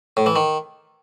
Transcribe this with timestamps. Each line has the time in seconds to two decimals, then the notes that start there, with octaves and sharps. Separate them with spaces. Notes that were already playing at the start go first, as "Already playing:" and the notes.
0.17 A2
0.26 E3
0.36 D#3